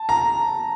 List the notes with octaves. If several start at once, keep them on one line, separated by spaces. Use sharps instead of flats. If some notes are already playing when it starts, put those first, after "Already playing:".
Already playing: A5
A#5